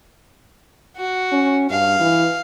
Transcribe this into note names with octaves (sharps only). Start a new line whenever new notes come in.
F#4
C#4
G2 F5
E3